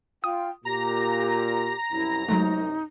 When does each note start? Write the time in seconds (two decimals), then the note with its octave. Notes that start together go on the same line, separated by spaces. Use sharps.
0.24 F4 G5 D#6
0.65 A#2 G4 A#5 A#6
1.92 C2 F#2 E4
2.29 F#3 G#3 A3 D#4